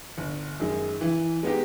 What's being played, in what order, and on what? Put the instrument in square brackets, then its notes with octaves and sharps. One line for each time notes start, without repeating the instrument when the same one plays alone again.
[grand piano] G1
F#2 D#3 G#3
E3
G#3 B3 D#4 G4